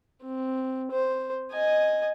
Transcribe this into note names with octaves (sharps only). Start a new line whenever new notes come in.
C4
C5
D#5 G#5